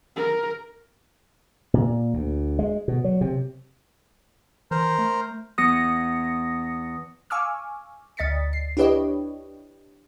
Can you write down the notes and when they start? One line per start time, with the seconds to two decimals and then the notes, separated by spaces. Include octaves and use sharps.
0.16 A#4
1.74 A#2
2.14 D2
2.59 G#3
2.88 B2
3.04 F#3
3.21 C3
4.71 E3 A#4 C5
4.99 A3
5.58 E2 D#6 A#6 C#7
7.30 F5 G#5 C#6 D6 E6 F6
8.17 D2 D#5 A6 B6 C#7
8.53 C7
8.77 D4 E4 G4 B4 C#5 D#5